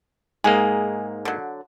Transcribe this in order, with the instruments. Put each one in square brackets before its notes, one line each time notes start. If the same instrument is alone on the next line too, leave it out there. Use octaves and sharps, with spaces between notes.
[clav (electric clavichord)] G#2 G#3 A#3 [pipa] G#4
[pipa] D3 F#3